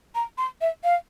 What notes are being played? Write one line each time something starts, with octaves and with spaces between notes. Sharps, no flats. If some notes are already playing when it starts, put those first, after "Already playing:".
A#5
C6
E5
F5